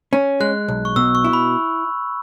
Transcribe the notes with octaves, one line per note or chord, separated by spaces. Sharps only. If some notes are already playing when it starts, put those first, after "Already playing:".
C#4
G#3 F#6
B1
C#6
B2 E6
C#6
E4
B5